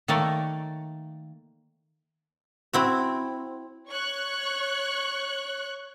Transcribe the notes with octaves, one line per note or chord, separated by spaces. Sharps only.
D#3 A3 A#3 C#5 D5
C4 E4 F#4
C#5 C#6 F#6